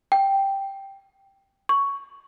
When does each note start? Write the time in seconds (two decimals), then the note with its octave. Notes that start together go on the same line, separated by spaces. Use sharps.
0.12 G5
1.69 C#6